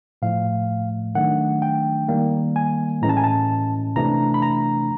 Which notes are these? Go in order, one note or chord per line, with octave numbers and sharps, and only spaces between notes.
A2 F3 A3 F5
D#3 F#3 A3 D4 F#5
G5
D#3 G3 A#3
G#5
A2 E3 G#3 C#4 A#5
A5
G#5
A5
C3 E3 A3 D4 A#5
B5
A#5